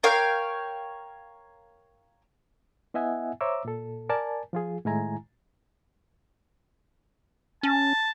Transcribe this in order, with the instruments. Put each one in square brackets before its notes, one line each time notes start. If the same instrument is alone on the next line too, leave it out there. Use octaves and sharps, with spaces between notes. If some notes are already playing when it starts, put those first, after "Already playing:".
[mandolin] A#4 C#5 F5 G5
[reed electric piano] B3 E4 D#5 E5 F#5 G#5
C5 C#5 E5 A#5 D6 E6
A#2 A4
A#4 D5 G#5 A5
F3 F4 G#4
A2 D#3 G#3 E4 G#5 A#5
[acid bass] C#4 [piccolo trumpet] A5